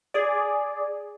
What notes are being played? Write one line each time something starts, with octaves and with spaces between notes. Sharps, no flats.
G#4 D5